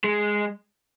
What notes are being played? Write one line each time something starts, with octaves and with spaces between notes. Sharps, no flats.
G#3